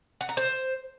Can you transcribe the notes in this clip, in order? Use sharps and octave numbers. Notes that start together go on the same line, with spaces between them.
F#5
A#5
C5